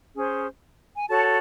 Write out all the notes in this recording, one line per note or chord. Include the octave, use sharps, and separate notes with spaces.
C#4 G#4 C5
G#5
F#4 A4 C#5 A5